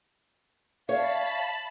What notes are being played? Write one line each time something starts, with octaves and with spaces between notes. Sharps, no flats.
C#5 E5 F5 A5 B5